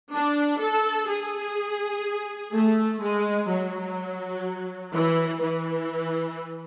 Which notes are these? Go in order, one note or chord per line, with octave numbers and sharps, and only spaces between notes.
D4
A4
G#4
A3
G#3
F#3
E3
E3